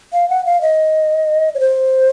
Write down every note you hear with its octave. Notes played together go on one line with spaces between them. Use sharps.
F5
F#5
F5
D#5
C#5
C5